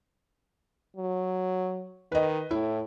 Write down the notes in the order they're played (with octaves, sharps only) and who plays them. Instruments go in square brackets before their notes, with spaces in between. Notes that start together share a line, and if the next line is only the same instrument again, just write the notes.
[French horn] F#3
[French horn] D#3 [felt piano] B4 D#5
[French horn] A2 [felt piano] E4